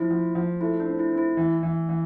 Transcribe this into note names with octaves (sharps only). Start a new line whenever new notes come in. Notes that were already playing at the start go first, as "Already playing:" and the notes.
Already playing: F3 E4
F3
F3
A3 E4
D4
C4
E4
C4
E4
E3
E3
E3